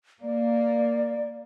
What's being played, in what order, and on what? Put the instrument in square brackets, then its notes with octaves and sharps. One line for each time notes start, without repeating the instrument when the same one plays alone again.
[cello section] A#3 [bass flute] D5